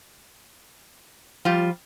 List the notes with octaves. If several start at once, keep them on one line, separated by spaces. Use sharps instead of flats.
F3 G3 F4